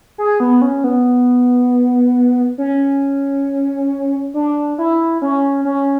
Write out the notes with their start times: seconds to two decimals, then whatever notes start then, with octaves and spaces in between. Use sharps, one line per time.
0.18 G#4
0.40 B3
0.62 C#4
0.84 B3
2.58 C#4
4.34 D4
4.78 E4
5.22 C#4
5.65 C#4